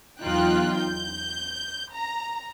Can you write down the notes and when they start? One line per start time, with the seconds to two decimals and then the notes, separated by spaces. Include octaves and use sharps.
0.22 E2 F#3 D#4 F4 G5 F#6
0.76 G6
1.93 A#5